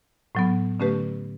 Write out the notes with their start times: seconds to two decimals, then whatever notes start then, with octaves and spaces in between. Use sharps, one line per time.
0.35 A2 F#3 B3
0.80 D3 A3 C#4 G4 B4